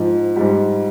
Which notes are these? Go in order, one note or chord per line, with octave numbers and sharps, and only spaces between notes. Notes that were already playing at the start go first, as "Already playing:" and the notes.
Already playing: G#2 F3
G#2 G3